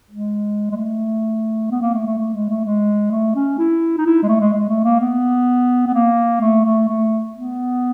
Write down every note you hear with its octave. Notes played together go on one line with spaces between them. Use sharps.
G#3
G#3
A3
B3
A#3
A3
A3
A3
G#3
A3
G#3
A3
C#4
E4
D#4
E4
G#3
A3
G#3
G#3
A3
A#3
B3
B3
A#3
A3
A3
A3
B3